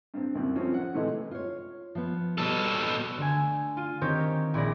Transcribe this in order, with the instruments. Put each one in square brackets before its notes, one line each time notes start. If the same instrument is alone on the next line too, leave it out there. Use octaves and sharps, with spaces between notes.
[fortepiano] G2 C4
C2 F#2 C3
F3 C4 C#4
F#5
A2 C3 E3 G#3 A3
[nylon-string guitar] F4 C#5
F3 B3
[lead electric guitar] B2 A4 [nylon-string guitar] G3
[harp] D3 A3 G#5
F4 D#7
D#3 C4 D#4 G4 A#4 C#5
A#1 E4 G#4 D5 B5 A#6